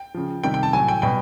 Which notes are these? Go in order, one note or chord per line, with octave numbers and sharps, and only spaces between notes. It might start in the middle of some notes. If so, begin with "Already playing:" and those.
Already playing: G5
C#3 F3
C3 D#3 G3 G5
G5
A5
A2 F#3 G#5
G5
B2 G3 G5